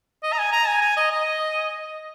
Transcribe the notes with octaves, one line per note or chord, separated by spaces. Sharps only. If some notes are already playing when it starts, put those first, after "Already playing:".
D#5
A#5
G#5
A#5
G#5
G#5
D#5
D#5